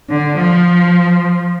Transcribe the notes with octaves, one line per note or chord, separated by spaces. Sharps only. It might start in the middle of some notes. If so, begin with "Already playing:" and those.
D3
F3